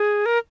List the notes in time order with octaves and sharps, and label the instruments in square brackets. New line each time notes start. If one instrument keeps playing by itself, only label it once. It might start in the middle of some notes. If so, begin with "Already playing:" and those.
Already playing: [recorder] G#4
A#4